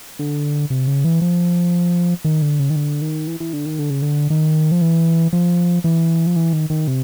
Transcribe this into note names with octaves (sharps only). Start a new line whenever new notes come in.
D3
C3
C#3
E3
F3
D#3
D3
C#3
D#3
D3
D#3
E3
E3
D3
D#3
D3
C#3
D3
D#3
F3
E3
F3
E3
F3
E3
D#3
D#3
C3